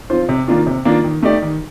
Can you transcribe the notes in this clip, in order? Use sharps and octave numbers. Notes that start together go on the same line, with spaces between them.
F3 C4 F4 C5
C3
D#3 A#3 D4 F4
C3
D#3 A#3 D4 F4
D#3
A3 D#4 G4 D5
D#3